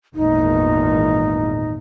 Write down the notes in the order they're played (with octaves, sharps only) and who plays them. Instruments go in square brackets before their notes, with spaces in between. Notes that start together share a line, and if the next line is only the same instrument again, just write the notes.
[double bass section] G#1 E2 A#2 [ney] D#4